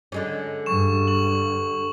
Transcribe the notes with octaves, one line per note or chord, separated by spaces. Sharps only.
D3 G#3 C#4
G2 C#6 E7
C#6 F#7